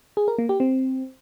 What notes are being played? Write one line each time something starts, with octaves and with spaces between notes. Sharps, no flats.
G#4
A#4
A#3
G4
C4